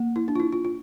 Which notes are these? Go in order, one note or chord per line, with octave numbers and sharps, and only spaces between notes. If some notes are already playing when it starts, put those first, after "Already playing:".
Already playing: A#3
E4
D4
F4
E4
F4
F4